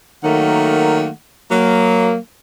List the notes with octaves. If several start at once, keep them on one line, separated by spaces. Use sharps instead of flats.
D#3 F#3 A3 A#3 F#5
F#3 A#3